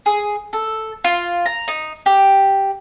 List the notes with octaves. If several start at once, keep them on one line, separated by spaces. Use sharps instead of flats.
G#4
A4
F4
A#5
D#4
G4